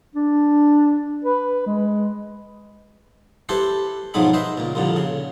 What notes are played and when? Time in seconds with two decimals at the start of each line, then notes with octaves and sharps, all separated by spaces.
0.15 D4
1.24 B4
1.66 G#3
3.49 E4 G4 A4 B4 C5
4.14 B1 G#2 F3 F#3 G#3 B5
4.33 B4 C5 D#5 E5
4.57 C#2 A#2
4.75 C2 F2 A#2 D3
4.96 C#3